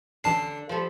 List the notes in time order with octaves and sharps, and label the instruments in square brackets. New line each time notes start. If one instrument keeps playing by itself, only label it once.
[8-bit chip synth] A1 A5 C7 [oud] D3
[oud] F3 G3 A4